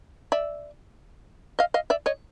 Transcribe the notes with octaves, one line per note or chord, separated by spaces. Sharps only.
D5 E5
D#5 F5
D#5 F5
D5 E5
C#5 D#5